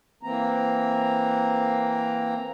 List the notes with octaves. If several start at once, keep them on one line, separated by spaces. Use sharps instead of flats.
E3 A#3 C4 A#5